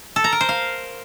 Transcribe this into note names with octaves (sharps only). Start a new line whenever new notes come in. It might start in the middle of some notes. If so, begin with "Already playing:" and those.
A4
A#5
A#4
C5
F5